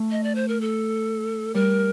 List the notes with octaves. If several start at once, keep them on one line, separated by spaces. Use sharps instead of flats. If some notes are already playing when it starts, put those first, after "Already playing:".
Already playing: A3
D#5
D5
C5
A#4
A4
G3 A#4